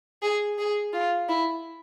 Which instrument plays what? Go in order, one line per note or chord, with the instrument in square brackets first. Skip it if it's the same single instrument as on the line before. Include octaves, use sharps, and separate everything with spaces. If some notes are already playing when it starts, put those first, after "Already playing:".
[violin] G#4
G#4
F4
E4